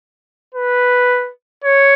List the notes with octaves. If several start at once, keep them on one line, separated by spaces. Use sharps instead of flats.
B4
C#5